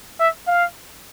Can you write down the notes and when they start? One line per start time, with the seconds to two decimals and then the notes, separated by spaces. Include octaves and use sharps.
0.20 E5
0.47 F5